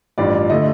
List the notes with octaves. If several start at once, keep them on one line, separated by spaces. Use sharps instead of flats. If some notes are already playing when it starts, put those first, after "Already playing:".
A1 G2 F3 D5
D3 A3 D#5